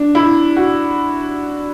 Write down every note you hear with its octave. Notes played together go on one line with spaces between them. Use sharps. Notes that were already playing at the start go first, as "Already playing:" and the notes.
Already playing: D4
E4
F#4